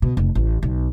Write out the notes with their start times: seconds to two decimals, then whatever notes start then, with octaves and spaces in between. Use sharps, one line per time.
0.02 B2
0.17 F1
0.35 A1
0.63 B1